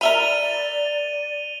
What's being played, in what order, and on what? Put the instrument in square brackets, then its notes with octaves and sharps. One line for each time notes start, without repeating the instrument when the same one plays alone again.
[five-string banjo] A#4 E5 B5 [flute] D5 [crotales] D#7 F7 G7